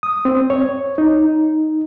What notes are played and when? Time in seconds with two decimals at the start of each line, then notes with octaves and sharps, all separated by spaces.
0.03 D#6
0.25 C4
0.50 C#5
0.98 D#4